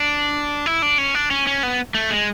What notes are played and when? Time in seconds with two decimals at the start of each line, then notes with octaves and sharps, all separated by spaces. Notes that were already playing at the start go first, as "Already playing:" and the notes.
Already playing: D4
0.66 E4
0.82 D4
0.98 C#4
1.15 D4
1.31 C#4
1.47 C#4
1.63 B3
1.94 A3
2.11 G#3